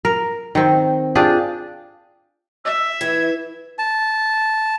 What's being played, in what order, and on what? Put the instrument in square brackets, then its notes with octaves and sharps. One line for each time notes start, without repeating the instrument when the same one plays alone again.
[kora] A#4
D#3 C4
D4 F4 G4 G#4
[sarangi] E5 [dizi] E6
[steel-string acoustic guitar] E3 [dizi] G#6
[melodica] A5